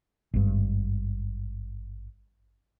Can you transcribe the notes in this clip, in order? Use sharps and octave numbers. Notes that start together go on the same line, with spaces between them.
G#1 G2